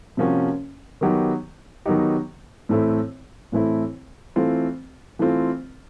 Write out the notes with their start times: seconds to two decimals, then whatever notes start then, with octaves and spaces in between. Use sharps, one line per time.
0.17 C3 F3 A#3 C#4 F#4
1.01 D#3 F#3 B3 D#4 G4
1.86 D#3 F#3 B3 D#4 G4
2.69 A2 E3 A3 C4 E4
3.52 A2 E3 A3 C4 E4
4.36 E3 A3 C4 F4
5.19 E3 A3 C4 F4